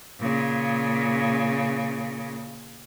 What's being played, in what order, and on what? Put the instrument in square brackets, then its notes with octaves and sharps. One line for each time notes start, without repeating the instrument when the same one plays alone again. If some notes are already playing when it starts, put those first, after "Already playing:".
[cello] A#2 C#3